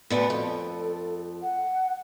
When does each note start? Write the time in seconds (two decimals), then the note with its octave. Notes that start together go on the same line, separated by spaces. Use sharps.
0.10 D2 D3 B3
0.30 F2 A4
1.42 F#5